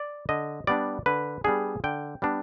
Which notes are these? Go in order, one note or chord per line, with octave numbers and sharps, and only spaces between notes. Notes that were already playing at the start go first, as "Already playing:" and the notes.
Already playing: D5
D3 D#5
G3 B3 D4 D5
D3 B4
G3 B3 D4 G#4
D3 G5
G3 B3 D4